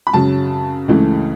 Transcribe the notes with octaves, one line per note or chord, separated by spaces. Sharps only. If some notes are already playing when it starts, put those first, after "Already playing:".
B5
F#2 C#3 F#3 A5
C#2 C#3 E3 A3